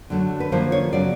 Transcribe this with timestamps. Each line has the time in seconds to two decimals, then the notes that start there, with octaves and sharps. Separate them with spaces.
0.10 D3 F#3 A3
0.40 B4
0.52 D3 F3 A#3 C5
0.72 C#5
0.92 C#3 F#3 B3 D5